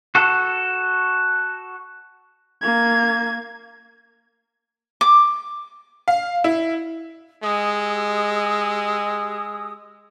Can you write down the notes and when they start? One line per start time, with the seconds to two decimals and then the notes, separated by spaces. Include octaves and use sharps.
0.15 F#4 A4
2.62 A#3 G#6
5.01 D6
6.08 F5
6.44 E4
7.43 G#3 G4 D#6 E6